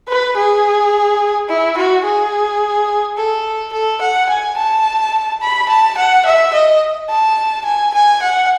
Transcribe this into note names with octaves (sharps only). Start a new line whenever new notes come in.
B4
G#4
E4
F#4
G#4
A4
A4
F#5
G#5
A5
B5
A5
F#5
E5
D#5
A5
G#5
G#5
F#5